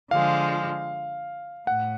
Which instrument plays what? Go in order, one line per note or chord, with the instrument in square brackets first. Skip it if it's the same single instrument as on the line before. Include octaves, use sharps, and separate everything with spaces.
[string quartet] D3 F3 G#3 [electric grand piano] F5
[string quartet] A2 [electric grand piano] F#5